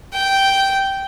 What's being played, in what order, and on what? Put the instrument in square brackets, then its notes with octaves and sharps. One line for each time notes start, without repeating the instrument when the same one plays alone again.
[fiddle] G5